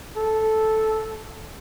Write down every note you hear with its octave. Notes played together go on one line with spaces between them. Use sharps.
A4